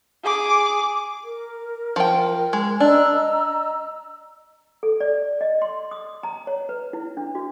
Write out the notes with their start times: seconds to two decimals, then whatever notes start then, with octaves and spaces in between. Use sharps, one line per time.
0.24 G#4 D6
1.25 A#4
1.96 F3 G5
2.53 G#3
2.80 D4 D#5 A#5 E6
4.83 A4
5.00 D5
5.41 D#5
5.62 C6
5.91 D#6
6.23 A#5
6.47 C#5
6.69 B4
6.93 E4
7.17 D4
7.35 F#4